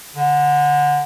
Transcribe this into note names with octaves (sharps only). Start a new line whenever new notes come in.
D3